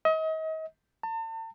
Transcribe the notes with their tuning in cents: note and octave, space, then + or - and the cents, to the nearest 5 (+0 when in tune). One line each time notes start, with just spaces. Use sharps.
D#5 +35
A5 +40